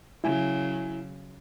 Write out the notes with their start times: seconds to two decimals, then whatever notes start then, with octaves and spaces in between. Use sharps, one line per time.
0.24 C#3 F#3 E4 G#5